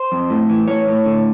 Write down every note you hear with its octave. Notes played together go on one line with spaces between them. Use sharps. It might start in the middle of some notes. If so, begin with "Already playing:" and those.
Already playing: C5
F2
A2
E3
A2 C#5
A2
D3